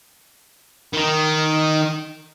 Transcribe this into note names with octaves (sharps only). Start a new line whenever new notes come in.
D#3 D#4